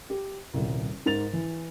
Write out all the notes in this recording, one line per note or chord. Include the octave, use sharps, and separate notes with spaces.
G4
D#1 C2
G#2 A#4 A6 F7
E3